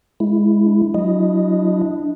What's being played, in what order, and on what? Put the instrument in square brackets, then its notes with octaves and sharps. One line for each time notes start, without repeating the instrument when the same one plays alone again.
[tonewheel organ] G#3 E4
[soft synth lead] D4
[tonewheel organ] F#3 E4 D#5